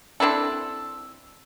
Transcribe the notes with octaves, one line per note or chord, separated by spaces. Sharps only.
C4 D4 E4 A4